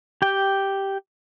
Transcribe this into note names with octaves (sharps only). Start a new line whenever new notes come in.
G4 G5